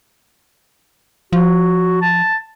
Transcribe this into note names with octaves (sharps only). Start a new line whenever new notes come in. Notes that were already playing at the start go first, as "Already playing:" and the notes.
F3 F#4
A5